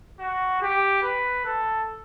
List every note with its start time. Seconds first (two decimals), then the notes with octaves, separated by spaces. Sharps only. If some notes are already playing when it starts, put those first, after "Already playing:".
0.20 F#4
0.62 G4
1.03 B4
1.45 A4